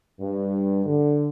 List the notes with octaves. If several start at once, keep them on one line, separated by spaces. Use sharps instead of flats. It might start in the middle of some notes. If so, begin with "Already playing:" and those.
G2
D3